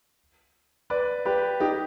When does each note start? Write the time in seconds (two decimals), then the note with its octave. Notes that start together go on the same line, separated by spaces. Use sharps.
0.90 B4 D5
1.25 G4 B4
1.60 D#4 G4